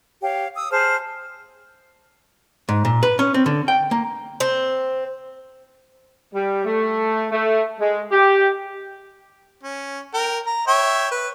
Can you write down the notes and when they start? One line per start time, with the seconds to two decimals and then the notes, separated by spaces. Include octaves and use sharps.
0.22 G4 C#5 F5
0.55 D#6 E6
0.71 G#4 C5 A5 F6
2.69 G#2
2.85 A#2
3.03 B4
3.19 C#4
3.34 C4
3.46 D3
3.68 G5
3.91 A#3
4.40 C4
6.33 G3
6.65 A3
7.31 A3
7.79 G#3
8.11 G4
9.63 C#4
10.14 A#4 G5
10.47 A#5
10.68 C#5 E5 G5
11.11 B4